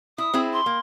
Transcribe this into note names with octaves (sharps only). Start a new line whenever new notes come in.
E4 D#6
C4 E4 G#4
C6
A#3